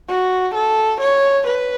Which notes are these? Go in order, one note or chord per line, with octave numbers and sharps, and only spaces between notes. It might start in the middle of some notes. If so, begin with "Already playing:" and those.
F#4
A4
C#5
B4